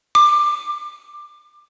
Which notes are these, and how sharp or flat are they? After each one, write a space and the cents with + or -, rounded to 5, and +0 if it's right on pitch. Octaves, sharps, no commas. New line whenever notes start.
D6 +20